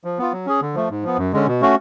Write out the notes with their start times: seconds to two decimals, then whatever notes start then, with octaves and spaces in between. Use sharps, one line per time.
0.04 F3
0.18 B3 F4
0.32 F#3
0.46 C#4 G#4
0.61 D3
0.75 F3 A3
0.90 G#2
1.03 F3 B3
1.18 F#2
1.33 D3 G#3 C#4
1.47 B2
1.61 A3 C#4 F#4